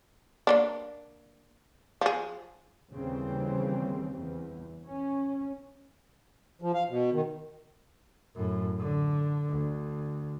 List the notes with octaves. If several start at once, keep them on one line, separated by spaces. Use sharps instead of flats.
A#3 C#4 D4
F3 G#4
D#2 C#3 E3 G3 C4
E2
C#4
F3
F5
B2
D#3
F#2 A2
D3
D2